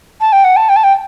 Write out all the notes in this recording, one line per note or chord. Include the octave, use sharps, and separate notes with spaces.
A5
G5
F#5
A5
G5
A5
G5